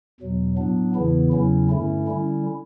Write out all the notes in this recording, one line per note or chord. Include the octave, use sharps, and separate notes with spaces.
E2 B2 F#3
A2 F#3 B3 D4
E2 C#3 E3 B3 E4
E2 C#3 F#3 C#4 E4
G2 D3 A3 C#4 E4
D3 G3 C#4 E4